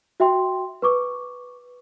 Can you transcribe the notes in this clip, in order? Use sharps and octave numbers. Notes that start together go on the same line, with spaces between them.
F#4 E5 G5 C6
B4 C#6 D6